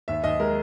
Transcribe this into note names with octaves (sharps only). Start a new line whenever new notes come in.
D#2 E5
D#2 D#5
G#3 A#4